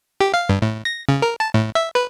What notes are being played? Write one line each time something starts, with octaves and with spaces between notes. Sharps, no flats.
G4
F5
G2
A2
A#6
C#3
A#4
A5
A2
E5
B4